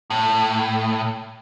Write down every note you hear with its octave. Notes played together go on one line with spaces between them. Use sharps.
A2